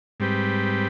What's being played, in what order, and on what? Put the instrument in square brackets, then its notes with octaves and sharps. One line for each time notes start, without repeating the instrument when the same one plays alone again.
[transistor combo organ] G#2 G3 C4 G4 B4